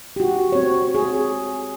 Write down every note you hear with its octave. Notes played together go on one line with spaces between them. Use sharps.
F#4 G4
C4 C#5
G#4